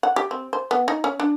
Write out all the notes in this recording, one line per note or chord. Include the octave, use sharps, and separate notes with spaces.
F#5
G4
C4
C5
B3
D#4
C#4
D4